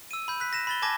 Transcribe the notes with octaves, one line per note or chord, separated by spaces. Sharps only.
E6 D#7
B5 G6
F#6 B6
A#6 B6 E7
B5 A6 G7
G#5 A5 D6 G#6 A#6